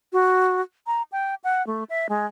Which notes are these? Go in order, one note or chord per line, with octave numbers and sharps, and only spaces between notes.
F#4
A#5
G5
F#5
A3
E5
G#3